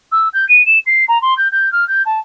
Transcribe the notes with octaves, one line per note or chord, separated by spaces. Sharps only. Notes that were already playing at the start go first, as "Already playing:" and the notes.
E6
G6
D#7
E7
C7
A#5
C6
G6
G6
F6
G6
A5